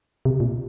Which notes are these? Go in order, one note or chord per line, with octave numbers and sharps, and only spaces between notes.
C3
A#2